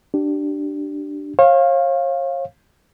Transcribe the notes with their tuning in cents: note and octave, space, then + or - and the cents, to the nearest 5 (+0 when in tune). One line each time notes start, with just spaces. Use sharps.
D4 +5 G4 -20
C#5 -40 F5 +0